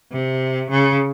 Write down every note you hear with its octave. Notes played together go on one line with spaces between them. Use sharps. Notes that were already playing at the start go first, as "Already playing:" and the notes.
C3
C#3